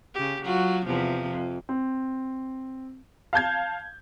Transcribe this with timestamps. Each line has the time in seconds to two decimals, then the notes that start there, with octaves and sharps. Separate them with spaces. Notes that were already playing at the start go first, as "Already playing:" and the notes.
0.14 C#3 G4
0.44 F#3 F4 F#4
0.86 E2 C3 F3
1.31 F2
1.69 C4
3.33 F5 A5 G6 G#6